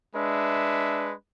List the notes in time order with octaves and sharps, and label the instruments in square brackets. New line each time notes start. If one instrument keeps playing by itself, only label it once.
[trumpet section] G#3 D4 B4 E5